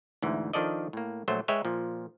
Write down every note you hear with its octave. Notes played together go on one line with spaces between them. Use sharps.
D2 G#2 E3
D#3 F3 D4 A4 D5 D#5
A2 A#3
A#1 F#3 A3 C5
G#3 B4 C#5 E5 G5
A#2 F3